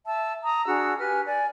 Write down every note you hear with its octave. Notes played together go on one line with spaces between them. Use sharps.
E5 A5 E6
A#5 D#6
D4 F#4 G#4 E6
G4 B4 G#5 F6
D5 G#5